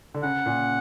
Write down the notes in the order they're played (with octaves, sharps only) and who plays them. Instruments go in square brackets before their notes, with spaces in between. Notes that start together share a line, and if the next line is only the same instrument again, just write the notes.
[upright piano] D3
[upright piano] C#3 [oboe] F#5
[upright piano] A#2